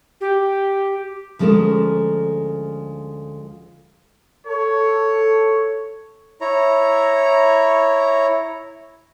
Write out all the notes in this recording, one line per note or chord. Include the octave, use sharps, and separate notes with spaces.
G4
D2 F3 G#3 C#4 A4 A#4
A4 C#5
E4 C#5 A#5